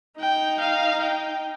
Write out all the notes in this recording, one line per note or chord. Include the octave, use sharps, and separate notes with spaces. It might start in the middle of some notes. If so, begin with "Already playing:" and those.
D#4 G5
F5
G5